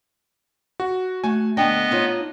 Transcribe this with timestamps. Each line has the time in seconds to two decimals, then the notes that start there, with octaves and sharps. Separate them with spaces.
0.80 F#4
1.24 A3 F#4 G#5
1.57 D2 G2 B3 D4 D#5 G5
1.91 D#4 F4 C#5